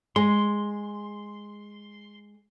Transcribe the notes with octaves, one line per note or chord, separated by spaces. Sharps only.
G#3 C6